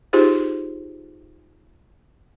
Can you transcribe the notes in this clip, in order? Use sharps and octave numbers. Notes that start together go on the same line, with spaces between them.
D#4 F4 G4 G#4 C5